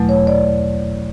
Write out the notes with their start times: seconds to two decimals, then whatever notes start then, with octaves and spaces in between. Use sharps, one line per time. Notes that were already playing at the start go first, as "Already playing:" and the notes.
Already playing: E2 B2 F#3 A3
0.09 C#5
0.27 D5